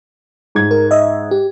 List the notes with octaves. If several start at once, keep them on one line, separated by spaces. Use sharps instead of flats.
G#2 G#6
A#4
D#5 E5
G4